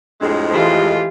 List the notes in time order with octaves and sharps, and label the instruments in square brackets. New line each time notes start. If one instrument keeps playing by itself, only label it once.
[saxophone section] F2 A2 G#3 [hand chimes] D4 G4 D#5
[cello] E3 F4 [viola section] G4 [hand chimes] C5 D#5 A5